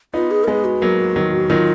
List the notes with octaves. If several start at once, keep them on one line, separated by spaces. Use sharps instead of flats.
B3 D#4 F4
G#4
A#4
G#3 B3 G#4
F#4
F#3 A#3
D#3 F#3
D#3 F#3 F4